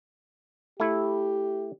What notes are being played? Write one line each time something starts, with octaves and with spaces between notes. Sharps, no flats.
A3 E4 G4